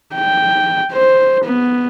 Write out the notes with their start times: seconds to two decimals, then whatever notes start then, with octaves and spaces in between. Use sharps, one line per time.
0.16 G5
0.93 C5
1.44 B3